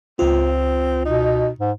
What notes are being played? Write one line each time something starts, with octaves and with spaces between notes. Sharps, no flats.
C#2 C4 F4
B2 D#4
G#2